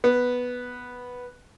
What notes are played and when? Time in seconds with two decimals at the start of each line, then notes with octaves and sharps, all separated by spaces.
0.04 B3